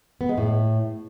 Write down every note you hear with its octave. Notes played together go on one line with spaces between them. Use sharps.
B3
G#3
A2